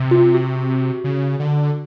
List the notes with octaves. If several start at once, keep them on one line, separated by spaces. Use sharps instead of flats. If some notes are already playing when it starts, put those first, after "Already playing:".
Already playing: C3
F4
F#4
C#3
D3